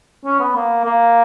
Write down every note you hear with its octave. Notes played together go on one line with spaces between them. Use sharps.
C#4
B3
A#3
A#3